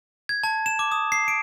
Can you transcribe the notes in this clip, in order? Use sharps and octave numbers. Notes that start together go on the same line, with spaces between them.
G#6
A5
E7
D6
D#6
C7
D7